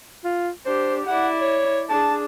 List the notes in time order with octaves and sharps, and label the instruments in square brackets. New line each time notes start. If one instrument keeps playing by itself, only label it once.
[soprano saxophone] F4
[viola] D4 G4 [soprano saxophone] C5
[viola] E4 D5 [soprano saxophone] F#5
[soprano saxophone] C#5
[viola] D4 G#4 [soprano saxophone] A5